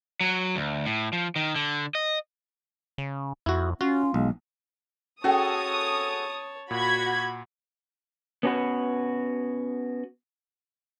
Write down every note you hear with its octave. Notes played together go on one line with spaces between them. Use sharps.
F#3
D2
A2
F3
D#3
D3
D#5
C#3
F2 E4 F#4
C#4 F4 F#4
B1 G#3
C#4 F#4 G#4 A4 C#5 G5 A5 D#6
A#2 F#4 B5 G#6
B3 C#4 D4 F4 F#4 B4